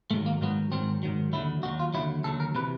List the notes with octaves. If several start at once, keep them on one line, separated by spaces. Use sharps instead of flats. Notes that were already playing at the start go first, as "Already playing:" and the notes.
G#2 D#3 F#3 A3
A#3
G#2 D#3 F#3 B3
G#2 D#3 F#3 C4
G#2 D#3 F#3
D#2 D3 F#3 E4
D#2 D3 F#3 F#4
F4
D#2 D3 F#3 E4
D#2 D3 F#3 A4
A#4
C3 E3 B4